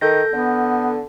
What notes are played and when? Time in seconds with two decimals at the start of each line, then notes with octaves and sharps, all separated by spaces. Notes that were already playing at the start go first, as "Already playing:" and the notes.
0.01 D#3 A4 G6 A#6
0.33 D3 B3